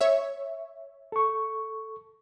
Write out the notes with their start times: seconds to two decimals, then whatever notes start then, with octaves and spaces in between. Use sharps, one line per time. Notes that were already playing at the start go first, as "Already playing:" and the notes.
0.01 C#5 E5
1.12 A4 C#6